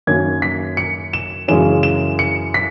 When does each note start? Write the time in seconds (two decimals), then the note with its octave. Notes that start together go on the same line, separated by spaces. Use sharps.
0.07 F#2 D#3 A#3 C#4 G#6
0.42 B6
0.77 C#7
1.13 E7
1.48 F#2 C#3 E3 G#3 C#4 E7
1.83 E7
2.19 C#7
2.54 B6